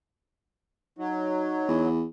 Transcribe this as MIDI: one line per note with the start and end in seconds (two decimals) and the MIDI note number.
0.99 1.88 54
0.99 1.86 63
1.68 2.04 40